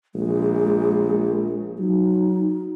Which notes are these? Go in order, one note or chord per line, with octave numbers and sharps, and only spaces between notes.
A#1 G#3
F#3 D#4